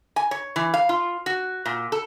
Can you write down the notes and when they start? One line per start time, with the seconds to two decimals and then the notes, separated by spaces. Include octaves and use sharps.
0.16 G#5
0.31 C#5
0.56 E3
0.74 F5
0.89 F4
1.26 F#4
1.66 A#2
1.92 A4